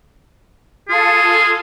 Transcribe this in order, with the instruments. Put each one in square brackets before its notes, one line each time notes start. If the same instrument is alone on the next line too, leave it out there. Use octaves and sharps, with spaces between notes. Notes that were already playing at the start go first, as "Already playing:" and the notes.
[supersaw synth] F4 A4 [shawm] G#4